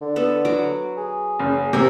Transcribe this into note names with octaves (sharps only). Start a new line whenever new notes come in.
D3
B3 A4
F#3 F#4 D6
G#4
F#1
C3 A#4 C#5